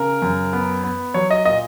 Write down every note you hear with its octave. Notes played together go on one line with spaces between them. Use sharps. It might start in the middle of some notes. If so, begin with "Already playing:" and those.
Already playing: C#3 A#4
F#2
B3
B3
F#3 C#5
D#5
A#2 D#5